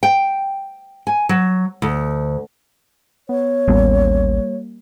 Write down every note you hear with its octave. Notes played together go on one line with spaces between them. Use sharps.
G5
G#5
F#3
D2
B3 C#5
A1 D#2 G3 A#3 B3 C#4